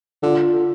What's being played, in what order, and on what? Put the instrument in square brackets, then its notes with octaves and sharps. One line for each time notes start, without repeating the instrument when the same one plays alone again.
[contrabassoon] D3 [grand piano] F4